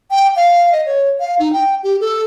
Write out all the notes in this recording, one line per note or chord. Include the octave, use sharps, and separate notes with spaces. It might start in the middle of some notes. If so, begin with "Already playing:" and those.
G5
F5
D#5
C#5
F5
D#4
G5
G4
A4